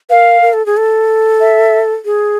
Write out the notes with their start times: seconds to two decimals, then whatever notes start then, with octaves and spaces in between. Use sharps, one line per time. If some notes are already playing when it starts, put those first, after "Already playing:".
0.09 A#4 B4 F5
0.42 A#4
0.53 A4
0.66 G#4
0.77 A4
1.40 E5
2.05 G#4